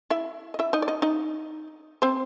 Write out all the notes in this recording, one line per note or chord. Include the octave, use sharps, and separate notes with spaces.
E4 E5
D#5
E4 E5
D#4 D#5
D5
D#4 D#5
D#4 D#5
C4 C5